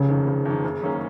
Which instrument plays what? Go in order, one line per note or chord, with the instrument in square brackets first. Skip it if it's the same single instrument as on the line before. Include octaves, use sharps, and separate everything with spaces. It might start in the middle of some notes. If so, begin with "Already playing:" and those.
Already playing: [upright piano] F1 [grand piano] C#3
[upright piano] F2 D#3
F1
F2 D#3
F#1
F#2 D#3 A#3 C#4